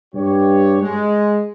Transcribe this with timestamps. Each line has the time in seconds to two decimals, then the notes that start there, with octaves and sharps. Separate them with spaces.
0.15 G2 G4 C#5
0.81 G#3